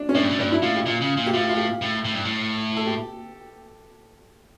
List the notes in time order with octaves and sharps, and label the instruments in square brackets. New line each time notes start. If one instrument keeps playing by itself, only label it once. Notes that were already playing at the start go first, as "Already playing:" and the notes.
Already playing: [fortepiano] D4
C#4
[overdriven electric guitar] A2 [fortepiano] D4
[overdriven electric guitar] G2
A2
[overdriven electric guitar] G2 [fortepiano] D4
[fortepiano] E4
[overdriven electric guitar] A2 [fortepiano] F4
[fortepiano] G4
[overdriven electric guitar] A#2 [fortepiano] F4
[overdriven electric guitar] C#3
A#2
[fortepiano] G4
[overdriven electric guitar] A2 [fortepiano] F4
[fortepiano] F4
G4
[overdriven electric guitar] A2
A2
G2
A2
[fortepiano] A4
G4